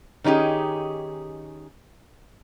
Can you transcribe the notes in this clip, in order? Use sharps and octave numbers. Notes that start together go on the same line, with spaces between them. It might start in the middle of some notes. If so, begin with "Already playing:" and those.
D#3 C#4 D#4 G4 G#4